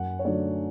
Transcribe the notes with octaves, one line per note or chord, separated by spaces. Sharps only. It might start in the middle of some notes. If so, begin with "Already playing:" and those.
Already playing: F#2 F#5
C#5
D3 F#3 A3 D5